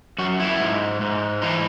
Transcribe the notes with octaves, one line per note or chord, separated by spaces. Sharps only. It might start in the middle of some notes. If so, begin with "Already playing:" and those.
F#2 F#4
E4
G#2
G#2
E3 D#4